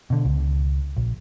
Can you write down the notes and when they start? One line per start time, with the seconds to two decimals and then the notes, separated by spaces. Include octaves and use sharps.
0.10 B2 D3
0.25 C#2
0.96 A#1